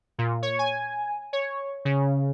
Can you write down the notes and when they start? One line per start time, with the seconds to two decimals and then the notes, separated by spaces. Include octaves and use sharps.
0.18 A#2
0.43 C#5
0.59 G#5
1.33 C#5
1.85 C#3